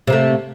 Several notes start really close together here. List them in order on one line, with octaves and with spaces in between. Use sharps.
C3 A#3 A3